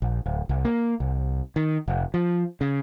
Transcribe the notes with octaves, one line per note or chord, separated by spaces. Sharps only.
A#1
D1
C2
A#3
C2
D#3
F1
F3
C#3